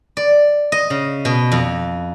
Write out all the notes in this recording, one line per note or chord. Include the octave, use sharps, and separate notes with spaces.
D5
D#5
C#3
B2
F2